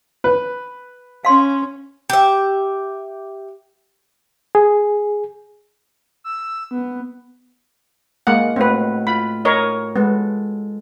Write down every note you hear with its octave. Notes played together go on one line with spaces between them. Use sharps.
B4
C#4 F5 C6
G4 E5
G#4
E6
B3
G#3 A#3 F#5
A2 C4 D#4 F#4 B4
F4 B5
A#4 C#5 D#5
G#3 B3 A4